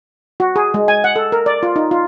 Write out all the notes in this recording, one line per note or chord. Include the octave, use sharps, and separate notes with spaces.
F#4
G#4
G#3
G#5
F#5
A4
A#4
D5
F4
D#4
F4